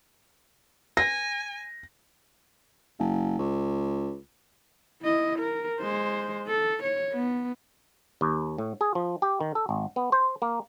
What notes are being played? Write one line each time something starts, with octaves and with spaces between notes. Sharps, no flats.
G#5 A#6
F#1
C#2
E4 D#5
A#4
G#3 C5
A4
C#5
B3
D#2
A2
G#4
F3
G4
D#3
A4
G#1
B3
C5
A#3